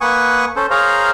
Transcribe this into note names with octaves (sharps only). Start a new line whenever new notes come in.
A#3 B4 F#5 G#5 C#6 D#6
C#4 A4 C5
G#4 A#4 C5 C#5 F5 A#5